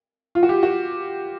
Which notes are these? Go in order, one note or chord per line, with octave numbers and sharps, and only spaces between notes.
F4
F#4
G4
F#4